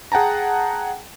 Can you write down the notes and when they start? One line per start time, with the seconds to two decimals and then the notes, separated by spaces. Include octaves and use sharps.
0.12 G#4 F#5 G5 A5 A#5